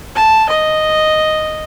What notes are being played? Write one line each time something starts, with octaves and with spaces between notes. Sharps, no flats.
A5
D#5